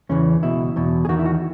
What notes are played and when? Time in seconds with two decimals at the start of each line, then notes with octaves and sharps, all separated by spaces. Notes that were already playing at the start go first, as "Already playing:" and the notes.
0.09 E2 C#3 E3 C#4
0.43 C#2 B2 E4
0.76 E2 B2
1.05 G#4
1.09 E2 D#3 F#4
1.19 E4
1.26 F#4